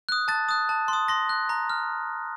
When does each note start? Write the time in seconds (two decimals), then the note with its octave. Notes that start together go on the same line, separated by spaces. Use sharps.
0.09 D#6 F#6
0.28 A5 A6
0.49 D#6 F#6
0.69 A5
0.88 C6
0.93 D#6
1.08 C6 A#6
1.29 F#6
1.49 A#5
1.70 F6